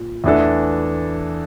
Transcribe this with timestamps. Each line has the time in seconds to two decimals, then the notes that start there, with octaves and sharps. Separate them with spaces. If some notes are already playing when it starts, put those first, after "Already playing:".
Already playing: A#2
0.24 E2 E3 A3 D4 A4